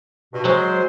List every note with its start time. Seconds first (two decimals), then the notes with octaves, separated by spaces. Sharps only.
0.33 G2 B2
0.45 F#3 G#3 C5